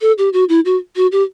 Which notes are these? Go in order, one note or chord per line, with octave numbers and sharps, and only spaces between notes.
A4
G4
F#4
E4
F#4
F#4
G4